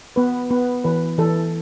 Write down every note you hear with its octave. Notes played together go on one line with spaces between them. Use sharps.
B3 B4
B3 B4
E3 B4
E3 A4